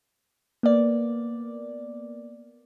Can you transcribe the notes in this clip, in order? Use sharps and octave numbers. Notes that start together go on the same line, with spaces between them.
A#3 B3 D5